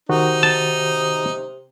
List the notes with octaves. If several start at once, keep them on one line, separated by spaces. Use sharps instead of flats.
C3 D#3 D#4 F#4
A5